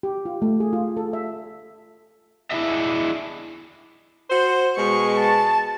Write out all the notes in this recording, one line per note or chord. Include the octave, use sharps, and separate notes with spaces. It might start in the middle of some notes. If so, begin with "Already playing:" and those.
G4
F4
A3
G#4
F4
A4
E5
D4 E4 F#4 G#4 D#5 E5
F#4 C5
B2 G#3 C#6
A5